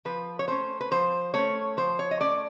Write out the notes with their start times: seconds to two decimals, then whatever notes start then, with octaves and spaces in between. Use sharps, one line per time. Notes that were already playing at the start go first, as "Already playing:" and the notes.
0.05 F3 B4
0.39 C#5
0.48 A3 C#4 C5
0.81 B4
0.91 F3 C5
1.34 A3 C#4 C#5
1.77 F3 C5
1.99 C#5
2.11 D#5
2.20 A3 C#4 D5